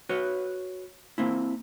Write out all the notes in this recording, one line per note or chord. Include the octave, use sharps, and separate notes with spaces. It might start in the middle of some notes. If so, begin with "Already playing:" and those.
F#4 B4 C#5
A#3 C4 E4